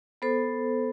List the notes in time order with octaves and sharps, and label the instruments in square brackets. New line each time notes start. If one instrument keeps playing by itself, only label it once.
[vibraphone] B3 A4 C5